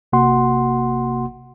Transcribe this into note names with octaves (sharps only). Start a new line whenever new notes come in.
G#1 C3 A#3 F#4 F#5 C6